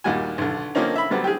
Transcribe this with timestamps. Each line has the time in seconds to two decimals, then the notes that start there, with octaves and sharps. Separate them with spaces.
0.04 D#2 A#2 G3 F#4 G#5
0.38 B1 D3
0.75 D3 F3 A#3 C4 C#4 D#4
0.95 E5 B5
1.10 D3 F#3 G3 B3 C4
1.24 G4 G#4